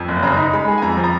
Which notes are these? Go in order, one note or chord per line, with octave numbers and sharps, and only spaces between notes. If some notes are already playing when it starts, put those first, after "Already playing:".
Already playing: F2
F#1
C#3 A#5
D#4
G#3 B5
G#4
G#5
F2 A#5
F3
A#5